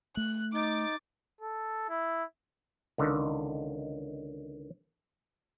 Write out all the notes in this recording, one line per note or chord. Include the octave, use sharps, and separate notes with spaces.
A3 F#6
D#4 D6 A6
A4
E4
C#2 D3 D#3